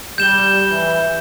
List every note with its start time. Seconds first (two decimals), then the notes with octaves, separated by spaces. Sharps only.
0.18 G3 G6 E7 G7
0.70 E3